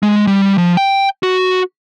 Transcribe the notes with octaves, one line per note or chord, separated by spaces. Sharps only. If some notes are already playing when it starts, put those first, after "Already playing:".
G#3
G3
F3
G5
F#4